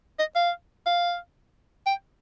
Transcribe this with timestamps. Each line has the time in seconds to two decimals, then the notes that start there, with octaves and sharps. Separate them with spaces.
0.19 D#5
0.36 F5
0.86 F5
1.86 G5